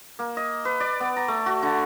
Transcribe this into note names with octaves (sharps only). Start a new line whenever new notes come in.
A#3
D#5
B4
D5
B3
A#5
A3
F#4
D3